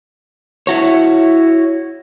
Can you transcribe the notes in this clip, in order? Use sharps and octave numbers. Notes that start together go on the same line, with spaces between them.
E4 F#4 C#5